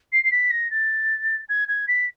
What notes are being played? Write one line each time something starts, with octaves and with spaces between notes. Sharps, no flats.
C7
C7
B6
A#6
A6
G#6
G#6
B6